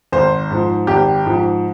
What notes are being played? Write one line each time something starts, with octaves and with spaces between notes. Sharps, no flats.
G#1 C5
G#2 F3
G#1 G4
G#2 F3